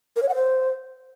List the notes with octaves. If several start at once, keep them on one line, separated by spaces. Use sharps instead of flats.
A#4
C#5
F#5
C5